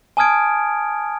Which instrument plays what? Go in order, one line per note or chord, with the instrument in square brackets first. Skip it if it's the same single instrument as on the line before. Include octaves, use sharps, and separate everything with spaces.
[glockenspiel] G#5 A5 D#6 F6 G#6 D7